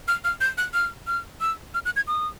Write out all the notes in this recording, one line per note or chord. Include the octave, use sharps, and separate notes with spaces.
F6
F6
G6
F#6
F6
F6
E6
F6
F#6
G#6
D#6